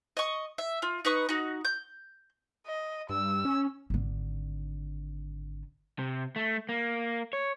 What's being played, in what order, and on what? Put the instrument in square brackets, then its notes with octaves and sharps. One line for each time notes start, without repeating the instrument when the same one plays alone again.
[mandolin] D#5 C#6
E5
F4
D#4 B4 C#6 D#6
D#4 F#4
G6
[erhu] D#5
[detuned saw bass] G2 [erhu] E6
[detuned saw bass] C#4
[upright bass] G#1 D3
[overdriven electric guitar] C3
A3
A#3
C#5